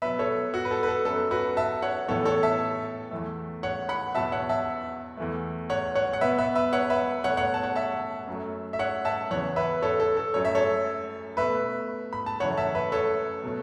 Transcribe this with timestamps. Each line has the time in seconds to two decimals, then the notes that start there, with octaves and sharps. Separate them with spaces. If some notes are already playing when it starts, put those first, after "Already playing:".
0.02 B2 F#3 B3 B4 E5
0.19 A4 C#5
0.54 F#4
0.65 B4
0.71 A4
0.83 B4
0.88 A4
1.05 F#2 F#3 B3 A4
1.31 F#4 B4
1.57 E5 A5
1.82 C#5 F#5
2.08 A2 E3 B3 A4 C#5
2.25 A4 C#5
2.43 E5 A5
3.11 E2 E3 A3
3.63 C#5 F#5
3.89 F#5 B5
4.15 E2 B2 F#3 B3 E5 A5
4.32 C#5 F#5
4.49 E5 A5
5.17 E2 E3 A3
5.70 C#5 F#5
5.95 C#5 F#5
6.13 F#5
6.21 B2 B3 B4 E5
6.38 B4 E5
6.55 B4 E5
6.73 C#5 F#5
6.90 B4 E5
7.24 B2 A3 C#5 F#5
7.37 C#5 F#5
7.54 A5
7.63 C#5 F#5
7.75 E5 A5
8.27 F#2 F#3 A3
8.73 E5
8.79 C#5 F#5
9.05 E5 A5
9.31 E2 C#3 E3 C#5 F#5
9.56 B4 E5
9.82 A4 C#5
10.00 A4
10.17 A4
10.34 F#2 F#3 A3 C#5
10.45 E5
10.55 A4 C#5
11.37 B2 A3 B4 E5
12.13 B5
12.26 A5
12.40 F#2 C#3 E3 A3 C#5 F#5
12.57 E5 A5
12.75 B4 E5
12.92 A4 C#5
13.43 B2 F#3 A3